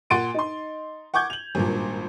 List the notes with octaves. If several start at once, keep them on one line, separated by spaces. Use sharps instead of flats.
A#2 F#5 C6 A6 D7 D#7
D#4 C6
F#5 C#6 D6 G6 G#6
F7 F#7
G#1 G2 A#2